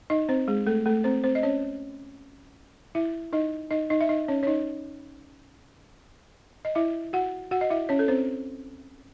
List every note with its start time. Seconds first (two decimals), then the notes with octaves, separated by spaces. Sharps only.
0.10 D#4 D#5
0.29 C4 C5
0.48 G#3 G#4
0.66 A3 A4
0.86 A3 A4
1.04 C4 C5
1.24 C4 C5
1.35 D#5
1.43 C#4 C#5
2.95 E4 E5
3.33 D#4 D#5
3.71 D#4 D#5
3.90 D#4 D#5
4.01 E5
4.09 D#4 D#5
4.28 C#4 C#5
4.43 C#5
4.47 D#4 D#5
6.65 D#5
6.75 E4 E5
7.13 F#4 F#5
7.51 F#4 F#5
7.61 D#5
7.70 E4 E5
7.89 C#4 C#5
7.99 A4
8.08 C4 C5